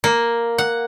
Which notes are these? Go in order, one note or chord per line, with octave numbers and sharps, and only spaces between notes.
A#3
F#5